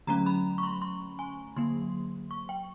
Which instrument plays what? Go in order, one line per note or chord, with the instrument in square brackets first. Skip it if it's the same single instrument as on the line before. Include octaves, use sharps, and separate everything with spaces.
[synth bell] D3 F#3 A3 C#4 A#5
B5
C#6
C6
C6
G#5
D3 F#3 A#3 C6
C#6
G5